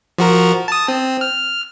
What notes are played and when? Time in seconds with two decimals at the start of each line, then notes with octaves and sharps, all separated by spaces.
0.18 F3 F#4 A#4
0.68 A5 D#6
0.88 C4
1.21 F6